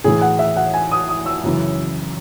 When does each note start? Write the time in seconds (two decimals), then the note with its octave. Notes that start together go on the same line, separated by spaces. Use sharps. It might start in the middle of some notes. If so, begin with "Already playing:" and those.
0.04 A2 E3 G#4
0.22 F#5
0.39 E5
0.56 F#5
0.74 G#5
0.92 D#6
1.09 D#6
1.26 E6
1.44 F#2 C#3 E3